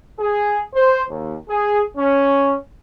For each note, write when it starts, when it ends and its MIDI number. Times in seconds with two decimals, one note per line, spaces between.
0.20 0.62 68
0.75 1.02 72
1.10 1.37 39
1.49 1.83 68
1.97 2.55 61